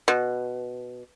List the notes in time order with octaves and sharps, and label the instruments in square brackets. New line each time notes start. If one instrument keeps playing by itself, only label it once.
[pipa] B2